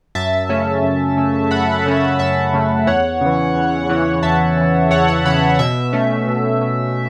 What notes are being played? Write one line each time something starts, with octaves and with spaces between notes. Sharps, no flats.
F#2 E5 A5
C#3 A3 C#4
F#2
C#3 A3 C#4
F#2 F#5 B5
C#3 A3 C#4
F#2 E5 A5
C#3 A3 C#4
E2 C#5 F#5
C#3 E3
E2
C#3 E3
E2 E5 A5
C#3 E3
E2 C#5 F#5
C#5 F#5
C#3 E3 F#5 B5
B2 E5
A3 C#4
B2
A3 C#4